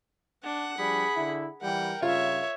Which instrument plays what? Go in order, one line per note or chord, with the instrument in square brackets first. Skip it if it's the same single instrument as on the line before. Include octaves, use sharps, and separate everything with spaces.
[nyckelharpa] D4 [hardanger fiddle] F#5
[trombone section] F3 G3 D4 [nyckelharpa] G#4 B5
[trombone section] D3 E4
[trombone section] E3 G3 [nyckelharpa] A#4 [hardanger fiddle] F#5 G5
[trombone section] G2 C#3 [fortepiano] F4 [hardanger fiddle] C#5 E5